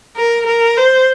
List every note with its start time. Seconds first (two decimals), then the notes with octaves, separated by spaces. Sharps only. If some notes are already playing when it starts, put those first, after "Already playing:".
0.16 A#4
0.47 A#4
0.77 C5